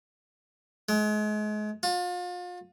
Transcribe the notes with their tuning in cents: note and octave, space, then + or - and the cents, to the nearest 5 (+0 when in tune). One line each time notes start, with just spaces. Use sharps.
G#3 +35
F4 +35